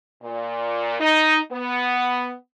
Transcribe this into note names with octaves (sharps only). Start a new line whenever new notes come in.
A#2
D#4
B3